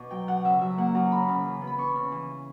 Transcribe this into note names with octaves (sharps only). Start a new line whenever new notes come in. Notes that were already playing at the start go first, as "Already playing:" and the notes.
Already playing: B2 B3 D4 D5
F#3 G5
F#2 F#5
C#3 E5
F#3 E5
A#3 F#5
F#2 A#5
C#3 B5
C#3
E3
B3
B5
D4 C#6
C#3
E3